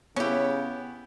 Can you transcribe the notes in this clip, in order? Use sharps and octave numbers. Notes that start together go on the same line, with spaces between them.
C#3 B3 C#4 E4 G4